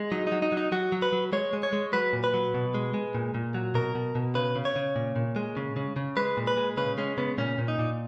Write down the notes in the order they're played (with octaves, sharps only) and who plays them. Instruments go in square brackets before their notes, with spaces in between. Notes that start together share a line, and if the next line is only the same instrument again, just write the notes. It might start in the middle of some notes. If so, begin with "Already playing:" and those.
Already playing: [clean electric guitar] G#3
F#3 D#4
D#4
F#3
D#4
F#3
D#4
F#3 F#4
F#3
B4
F#3
G#3 C#5
G#3
C#5
G#3
F#3 B4
A#2
B4
F#3
B2
G#3
G#3
A#2
A#2
F#3
B2 A#4
B2
B2
C#3 B4
C#3
C#5
C#3
A#2
A#2
G#3
C#3
C#3
C#3
G#3 B4
A#2
B4
G#3
C#3 B4
G#3 C#4
C#3 B3
A#2 C#4
A#2
D#4
A#2